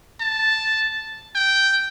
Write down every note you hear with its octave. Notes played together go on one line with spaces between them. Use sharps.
A5
G5